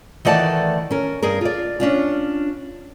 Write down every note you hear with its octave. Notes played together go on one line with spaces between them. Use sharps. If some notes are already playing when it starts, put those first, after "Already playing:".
D#3 E3 A3 D5 F#5 A5
C#4 A#4
G2 G#4 A#4
F4 D5
C#4 D4 F4